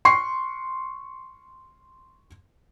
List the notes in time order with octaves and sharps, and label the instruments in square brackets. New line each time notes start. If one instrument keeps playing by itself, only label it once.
[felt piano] C6 C#6 C7